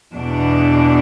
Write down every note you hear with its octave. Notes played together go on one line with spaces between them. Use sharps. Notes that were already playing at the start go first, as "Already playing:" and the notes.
E2 B2 D4